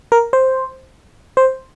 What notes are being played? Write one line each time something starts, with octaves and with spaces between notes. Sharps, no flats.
A#4
C5
C5